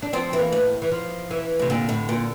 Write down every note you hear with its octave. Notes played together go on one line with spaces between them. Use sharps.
D4
F3 C4
E3
A#3
A2
E3
F3
E3
A2 C3
A#2 D3
A2
A#2